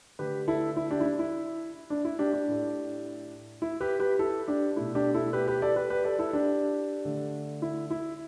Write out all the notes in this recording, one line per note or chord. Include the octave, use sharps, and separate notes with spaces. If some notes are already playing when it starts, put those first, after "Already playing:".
D3 A3 G4 B4
E4 A4
E4
D4 G4
E4
D4
E4
D4
E4
D4 G4
D4 G4
A2 A3
E4
G4 B4
G4 B4
E4 A4
D4 G4
B2 A3 E4
D4 G4
E4 A4
G4 B4
G4 B4
A4 D5
G4 B4
G4 B4
A4 D5
E4 A4
D4 G4
D3 A3
E4
E4